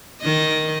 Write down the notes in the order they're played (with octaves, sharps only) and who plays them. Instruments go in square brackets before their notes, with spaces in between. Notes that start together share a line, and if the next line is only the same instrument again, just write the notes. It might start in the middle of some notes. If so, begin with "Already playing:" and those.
[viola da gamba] D#3 D#5